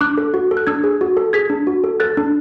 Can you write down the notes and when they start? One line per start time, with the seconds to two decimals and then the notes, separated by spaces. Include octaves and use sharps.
0.01 D4 D6 F#6
0.18 A4
0.34 F#4
0.51 A4
0.57 F#6
0.67 D4 E6 G#6
0.84 G#4
1.01 F#4
1.17 A4
1.33 G#4 G#6 B6
1.50 D4
1.67 F#4
1.84 A4
2.00 A4 F#6 A6
2.17 D4